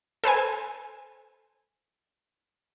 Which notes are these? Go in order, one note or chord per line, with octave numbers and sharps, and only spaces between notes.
A4 B4 C5 G#5